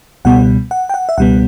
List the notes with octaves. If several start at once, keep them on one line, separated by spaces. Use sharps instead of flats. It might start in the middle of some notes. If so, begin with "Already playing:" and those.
C#2 B2 G3 B3 F#5
F#5
G5
F#5
E5
C#2 B2 G3 B3 F#5